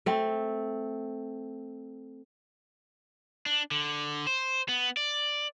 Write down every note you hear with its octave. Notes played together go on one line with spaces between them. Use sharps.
A3 C4
D4
D3
C5
B3
D5